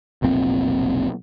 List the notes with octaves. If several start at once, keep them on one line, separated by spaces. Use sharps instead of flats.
F1 B1 A#2 C4